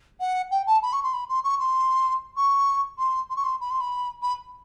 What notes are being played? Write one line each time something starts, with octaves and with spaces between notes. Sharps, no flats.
F#5
G5
A5
B5
C#6
C6
B5
C6
C#6
C6
C#6
C6
C6
C#6
C6
B5
C6
B5
B5